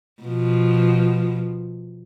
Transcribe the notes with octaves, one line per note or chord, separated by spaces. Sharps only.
B2 F3